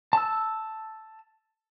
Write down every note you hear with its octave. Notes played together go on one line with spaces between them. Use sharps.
A5 E6